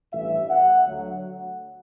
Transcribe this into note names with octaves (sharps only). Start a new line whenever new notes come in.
A1 G2 E3 E5
F#5
D2 D3 F#3